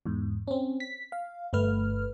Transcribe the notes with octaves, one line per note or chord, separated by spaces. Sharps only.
E2 G#2
C4 C#4
B6
F5
G1 A3 B4 F6